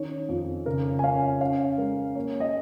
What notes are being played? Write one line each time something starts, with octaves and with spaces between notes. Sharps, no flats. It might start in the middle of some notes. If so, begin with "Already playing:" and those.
Already playing: D#3 C#4 C#5
F2
C#3 A#4
G#5
C#4 F5
C#4 F5
G#3 A#4
A#3 C#5
D#5